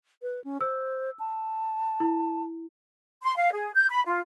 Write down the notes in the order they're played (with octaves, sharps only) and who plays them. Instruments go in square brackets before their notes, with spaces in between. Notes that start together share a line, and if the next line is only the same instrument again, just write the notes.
[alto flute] B4
C#4
[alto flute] C5 [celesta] E6
[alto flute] A5
[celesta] E4
[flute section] C6
F5
G#4
G6
B5
F4